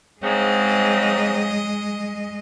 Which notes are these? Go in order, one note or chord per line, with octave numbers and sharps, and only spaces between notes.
G#2 C#3 G#3 C4 D#5